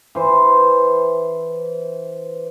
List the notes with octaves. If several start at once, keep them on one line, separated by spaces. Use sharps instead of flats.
E3 C5